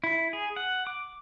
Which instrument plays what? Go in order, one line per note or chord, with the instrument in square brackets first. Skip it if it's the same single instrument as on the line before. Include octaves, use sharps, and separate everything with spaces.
[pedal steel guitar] E4
G#4
F#5
D6